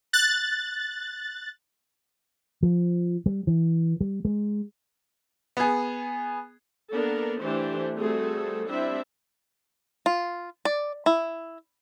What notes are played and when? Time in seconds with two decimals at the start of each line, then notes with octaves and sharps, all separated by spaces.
0.13 F#6 A6
2.63 F3
3.26 G3
3.47 E3
4.01 G3
4.25 G#3
5.57 B3 G#4
6.92 A#3 B3 D4 A4 A#4
7.41 E3 A3 D4 G4 C5
7.97 G3 A3 C4 F#4 G#4 A4
8.69 G3 C4 D4 E4 C5 E5
10.06 F4
10.65 D5
11.06 E4